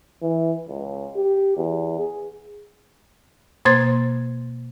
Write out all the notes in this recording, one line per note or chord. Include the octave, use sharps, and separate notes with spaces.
E3
C#2
G4
E2
G#4
B2 A#3 C5 C6 G#6 A6